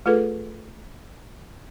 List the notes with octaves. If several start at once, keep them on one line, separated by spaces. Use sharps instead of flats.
A3 F4 G#4 A4 B4